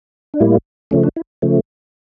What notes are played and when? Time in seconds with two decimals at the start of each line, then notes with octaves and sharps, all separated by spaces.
0.34 D4
0.40 A2 G3 A#3 E4
0.91 C#3 F3 A3 C#4
1.04 D4
1.16 E4
1.42 C#3 F3 A3